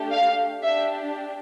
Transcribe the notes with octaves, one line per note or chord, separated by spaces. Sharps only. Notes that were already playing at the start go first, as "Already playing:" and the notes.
Already playing: A3 D4 G4
F5
D4 G4 E5